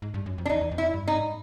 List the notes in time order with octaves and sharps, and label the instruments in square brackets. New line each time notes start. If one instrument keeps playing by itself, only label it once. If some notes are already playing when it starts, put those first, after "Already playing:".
[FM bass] G#2
G2
F#2
F2
[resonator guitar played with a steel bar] D4
[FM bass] E2 [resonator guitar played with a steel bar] D#4
[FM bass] E2
F2
[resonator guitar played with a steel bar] E4
[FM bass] G2
[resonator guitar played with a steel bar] D#4
[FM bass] G#2